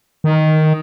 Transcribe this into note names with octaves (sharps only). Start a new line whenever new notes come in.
D#3